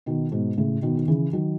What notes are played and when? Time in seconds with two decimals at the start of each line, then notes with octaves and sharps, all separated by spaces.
0.06 B2 D#3
0.32 G#2 B2
0.58 A2 C#3
0.82 B2 D#3
0.97 D#3
1.08 C#3 E3
1.33 D#3 F#3